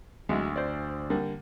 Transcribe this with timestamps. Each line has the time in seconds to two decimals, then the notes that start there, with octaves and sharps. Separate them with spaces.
0.29 D2 F#3 G#3 E5
0.56 C5 D5
1.10 D3 G3 A#3